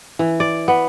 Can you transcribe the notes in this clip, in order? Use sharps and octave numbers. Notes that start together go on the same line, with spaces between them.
E3
D5
B3